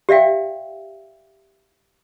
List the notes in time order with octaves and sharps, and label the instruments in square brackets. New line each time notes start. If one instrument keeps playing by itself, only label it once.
[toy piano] G4 D5 E5 F5 G5